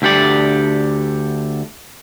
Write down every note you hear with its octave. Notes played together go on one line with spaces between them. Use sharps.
D2 D3 G4 A4 D5